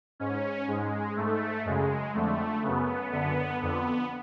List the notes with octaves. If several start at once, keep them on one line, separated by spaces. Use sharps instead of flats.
G#2 C#4
G#2 G#3
G#2 A3
F#2 C#3 G#3
F2 D3 A3
F#2 C#3 B3
F#2 D3 B3
F2 D3 B3